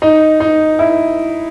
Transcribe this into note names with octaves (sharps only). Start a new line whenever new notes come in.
D#4
D#4
E4